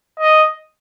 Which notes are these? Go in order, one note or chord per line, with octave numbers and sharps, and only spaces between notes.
D#5